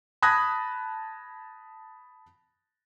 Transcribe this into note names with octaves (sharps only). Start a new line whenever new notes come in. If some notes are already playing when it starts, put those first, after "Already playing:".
A5 B5 D#6 F#6 G#6 A#6